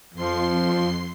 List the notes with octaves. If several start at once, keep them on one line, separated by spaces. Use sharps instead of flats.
F2 F3 C6 C7